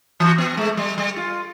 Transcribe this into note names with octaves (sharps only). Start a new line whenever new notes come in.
E3 F#4
B3
G#3 A3
G3
G3
F4